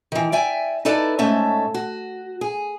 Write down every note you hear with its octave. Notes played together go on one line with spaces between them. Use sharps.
D#3 E3
D5 E5 G5 G#5
D#4 E4 A4 B4 D5
G#2 A3 C#4 A4 E5
F#4
G#4